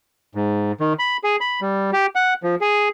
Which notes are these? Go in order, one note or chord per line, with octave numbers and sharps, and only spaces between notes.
G#2
D#3
B5
G#4
B5
G3
G4
F#5
F3
G#4